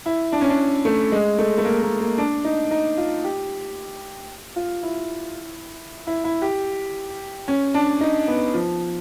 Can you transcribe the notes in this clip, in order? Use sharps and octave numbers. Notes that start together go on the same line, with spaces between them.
E4
D4
C#4
D4
A3
G#3
A3
A3
A#3
A#3
A#3
D4
D#4
D#4
F4
G4
F4
E4
E4
E4
G4
C#4
D4
D#4
B3
F3